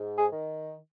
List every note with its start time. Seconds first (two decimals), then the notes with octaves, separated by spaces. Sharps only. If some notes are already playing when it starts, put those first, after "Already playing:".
Already playing: G#2
0.17 G#4
0.32 D#3